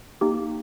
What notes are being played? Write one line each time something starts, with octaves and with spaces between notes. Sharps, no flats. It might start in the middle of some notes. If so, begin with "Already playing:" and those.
A#3 D#4 G4